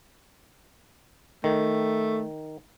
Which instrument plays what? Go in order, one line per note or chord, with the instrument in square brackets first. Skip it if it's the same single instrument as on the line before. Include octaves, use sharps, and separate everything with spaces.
[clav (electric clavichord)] D#3 [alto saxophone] A3